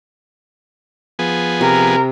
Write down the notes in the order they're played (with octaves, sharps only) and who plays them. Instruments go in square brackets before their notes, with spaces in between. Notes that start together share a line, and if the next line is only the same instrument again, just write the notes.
[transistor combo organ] F3 B3 G#4
[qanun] C3 [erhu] A#4